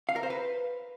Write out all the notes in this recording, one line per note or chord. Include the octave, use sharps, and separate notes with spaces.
F5
A#4
C5
B4